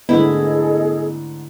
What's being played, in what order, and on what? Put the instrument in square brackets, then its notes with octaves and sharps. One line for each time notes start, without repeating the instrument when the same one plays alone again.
[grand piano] G#2 D3 A3 [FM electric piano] B3 [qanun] E4 [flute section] G#4 A4 D#5